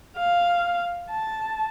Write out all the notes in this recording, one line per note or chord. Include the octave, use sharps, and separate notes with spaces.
F5
A5